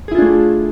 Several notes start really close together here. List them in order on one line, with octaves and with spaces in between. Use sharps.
G#4 E4 F4 D4 A3